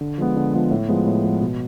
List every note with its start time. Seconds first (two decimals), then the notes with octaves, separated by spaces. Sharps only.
0.01 D3
0.18 F3 G#3 B3
0.36 D3
0.54 F3 G#3 B3
0.71 A2
0.89 F3 G#3 B3
1.07 A2
1.23 F3 G#3 B3
1.41 B2